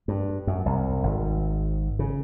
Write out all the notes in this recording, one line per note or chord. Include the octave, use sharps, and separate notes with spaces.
G2
F#2
C2
G#1
C#3